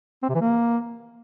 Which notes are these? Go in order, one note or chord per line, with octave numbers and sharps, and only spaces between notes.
C4
C3
E3
A#3